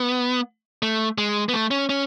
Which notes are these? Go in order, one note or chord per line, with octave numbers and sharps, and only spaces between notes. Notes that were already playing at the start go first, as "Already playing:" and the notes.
Already playing: B3
A3
G#3
B3
A3
C#4
C#4